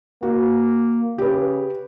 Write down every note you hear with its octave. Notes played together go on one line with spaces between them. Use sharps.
A#3 F#4
C#3 G4 B4